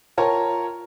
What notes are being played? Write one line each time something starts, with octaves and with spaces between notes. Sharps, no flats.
F4 A#4 C#5 G5 A5 A#5